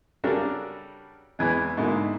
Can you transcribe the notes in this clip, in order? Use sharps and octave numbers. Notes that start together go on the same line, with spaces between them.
C#3 G3 D4 F#4 A4 A#4
E2 E3 G#3
G#2 B2 D3 A#3 D#4 E4